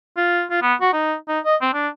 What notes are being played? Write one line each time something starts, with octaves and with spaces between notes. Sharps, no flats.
F4
F4
B3
F#4
D#4
D#4
D#5
C4
D4